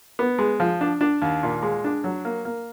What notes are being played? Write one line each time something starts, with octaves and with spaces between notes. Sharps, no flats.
B3
G#3
F3
D4
D4
D#2
A#2
G#3
D4
F#3
A#3
A#3